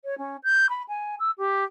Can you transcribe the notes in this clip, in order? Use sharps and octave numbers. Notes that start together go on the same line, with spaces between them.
C#5
C#4
G6
B5
G#5
E6
G4